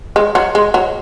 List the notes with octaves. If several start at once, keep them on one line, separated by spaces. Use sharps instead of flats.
G#3
F#3
G#3
F#3